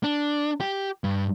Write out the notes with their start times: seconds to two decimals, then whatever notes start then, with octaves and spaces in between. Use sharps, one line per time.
0.04 D4
0.60 G4
1.04 G2